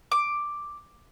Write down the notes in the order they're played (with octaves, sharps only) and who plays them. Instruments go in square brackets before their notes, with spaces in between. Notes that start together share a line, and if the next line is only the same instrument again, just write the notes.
[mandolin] D6